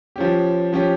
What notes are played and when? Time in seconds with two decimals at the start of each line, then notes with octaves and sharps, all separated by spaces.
0.16 F3 C#4 G4
0.73 F3 C#4 G4